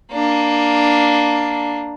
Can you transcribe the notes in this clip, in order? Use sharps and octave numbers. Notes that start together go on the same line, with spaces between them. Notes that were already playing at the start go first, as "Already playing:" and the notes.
A#3 D4